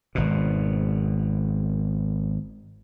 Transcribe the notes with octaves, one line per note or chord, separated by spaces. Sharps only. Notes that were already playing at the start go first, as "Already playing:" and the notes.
G#1 B2